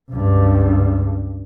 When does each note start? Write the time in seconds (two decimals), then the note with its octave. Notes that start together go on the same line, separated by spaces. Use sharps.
0.12 C#2 G2